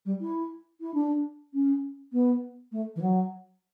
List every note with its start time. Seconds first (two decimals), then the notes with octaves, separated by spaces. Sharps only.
0.05 G3
0.21 E4
0.81 E4
0.94 D4
1.54 C#4
2.13 B3
2.72 A3
2.96 E3
3.02 F#3